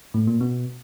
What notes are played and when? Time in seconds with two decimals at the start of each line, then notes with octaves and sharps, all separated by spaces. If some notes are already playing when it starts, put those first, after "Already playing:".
0.14 A2
0.27 A#2
0.41 B2